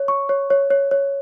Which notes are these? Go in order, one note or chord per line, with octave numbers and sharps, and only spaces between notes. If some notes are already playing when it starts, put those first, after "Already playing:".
Already playing: C#5
C#6
C#5
C#5
C#5
C#5